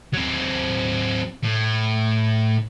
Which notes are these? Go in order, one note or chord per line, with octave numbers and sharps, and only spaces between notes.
F#3 C4
A2